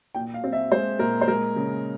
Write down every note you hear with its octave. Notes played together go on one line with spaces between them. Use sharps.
A#2 G5
F5
C4
E5
G#3 C5
A#2 A#4
C5
G#3 A#4
C#3